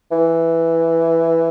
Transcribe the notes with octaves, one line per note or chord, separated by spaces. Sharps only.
E3